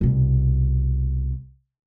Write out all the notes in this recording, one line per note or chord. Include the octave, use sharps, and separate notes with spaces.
C2 B2